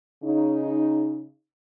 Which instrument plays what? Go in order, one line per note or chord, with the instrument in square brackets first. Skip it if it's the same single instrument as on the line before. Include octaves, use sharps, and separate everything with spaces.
[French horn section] C#3 D#4